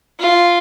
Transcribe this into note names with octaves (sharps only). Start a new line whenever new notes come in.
F4